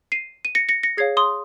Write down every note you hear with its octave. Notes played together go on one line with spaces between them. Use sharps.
C7 D#7
D#7
A#6 C#7
A#6 C#7
A#6 C#7
G#4 C#5 F5 G#6 C7
C6 D#6